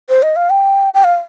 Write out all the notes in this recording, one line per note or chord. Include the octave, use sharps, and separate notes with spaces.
C5
D#5
F5
G5
G5
F5